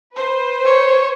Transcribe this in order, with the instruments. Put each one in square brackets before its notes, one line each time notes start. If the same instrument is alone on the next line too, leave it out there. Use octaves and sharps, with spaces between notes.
[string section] B4 C5
[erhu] C#5